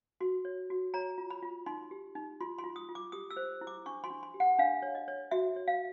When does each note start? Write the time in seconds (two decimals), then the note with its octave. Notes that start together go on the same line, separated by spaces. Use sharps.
0.21 F#4 C6
0.45 C#5
0.70 F#4
0.94 C#5 A#5
1.18 F4
1.30 B5
1.42 F4
1.66 D#4 C6
1.91 G4
2.15 D#4
2.41 F4 C6
2.58 C6
2.64 F4
2.76 D#6
2.89 F4
2.95 D6
3.12 G4 D#6
3.31 E6
3.37 C5
3.61 E4
3.67 D6
3.86 D4 C#6
4.04 C6
4.10 D4
4.23 C6
4.34 G4
4.40 F#5
4.59 D4 F5
4.82 C#5
4.95 D#5
5.08 C#5
5.31 F#4 E5
5.56 C#5
5.68 F5